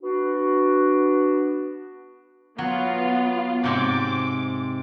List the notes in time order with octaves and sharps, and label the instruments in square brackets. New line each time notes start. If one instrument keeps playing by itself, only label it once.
[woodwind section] B3 D4 F#4
[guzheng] F#3 [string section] B3 F4
[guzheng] G#2 C3 G#3 [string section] D6